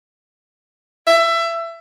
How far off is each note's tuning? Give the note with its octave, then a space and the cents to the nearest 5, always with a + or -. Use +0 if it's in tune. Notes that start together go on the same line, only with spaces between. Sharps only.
E5 +20